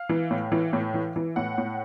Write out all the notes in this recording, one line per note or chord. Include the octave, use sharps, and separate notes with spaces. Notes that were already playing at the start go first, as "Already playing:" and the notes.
Already playing: F5
E3
A2
E3
A2
E3
E3
A2 F#5
A2